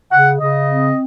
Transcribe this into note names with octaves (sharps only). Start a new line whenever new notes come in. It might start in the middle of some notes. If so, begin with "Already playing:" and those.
C#3 F#5
C#3 D#5
C4